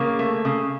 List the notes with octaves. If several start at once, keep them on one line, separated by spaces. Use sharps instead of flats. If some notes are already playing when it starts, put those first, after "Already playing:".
Already playing: C#3 A#3
A3
C#3